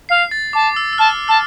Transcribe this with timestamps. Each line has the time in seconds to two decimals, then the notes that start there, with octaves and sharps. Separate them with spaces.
0.09 F5 C7
0.31 A6
0.53 A5 D6
0.76 E6
0.93 E6
0.98 A5 F6
1.28 A5 E6